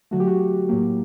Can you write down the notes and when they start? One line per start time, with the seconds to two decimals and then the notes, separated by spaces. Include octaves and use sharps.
0.11 D3 F#3 A3 F#4
0.20 G4
0.27 F#4
0.69 A2 F#3 A#3 G4